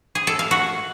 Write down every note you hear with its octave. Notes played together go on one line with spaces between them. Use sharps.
G#4
A4
F5
F#4